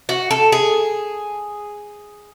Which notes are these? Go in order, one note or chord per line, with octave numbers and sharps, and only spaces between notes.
F#4
A4
G#4